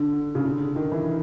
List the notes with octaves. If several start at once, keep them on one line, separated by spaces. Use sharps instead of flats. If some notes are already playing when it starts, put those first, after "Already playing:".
Already playing: D3
C#3
D3
D#3
E3